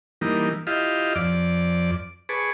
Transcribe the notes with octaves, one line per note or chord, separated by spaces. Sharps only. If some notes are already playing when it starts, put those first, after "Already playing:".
E3 G3 A#3 D#4
E4 F4 G4 D#5 F5
F2 D5 D6
G#4 B4 A5 C#6 D6